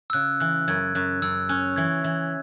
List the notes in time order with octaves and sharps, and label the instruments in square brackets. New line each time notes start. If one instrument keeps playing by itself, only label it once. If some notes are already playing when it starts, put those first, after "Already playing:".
[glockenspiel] E6
[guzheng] C#3 [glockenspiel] F#6
[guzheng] E3 [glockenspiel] F#6
[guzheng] F#2 [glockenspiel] G#6
[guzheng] F#2 [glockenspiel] F#6
[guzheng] F#2 [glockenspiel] E6
[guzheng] C#4 [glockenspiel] F#6
[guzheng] E3 [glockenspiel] G#6
[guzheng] E3